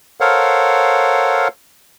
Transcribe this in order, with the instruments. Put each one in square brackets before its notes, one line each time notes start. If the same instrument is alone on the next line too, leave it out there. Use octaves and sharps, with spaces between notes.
[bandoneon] A4 A#4 C5 C#5 F5 F#5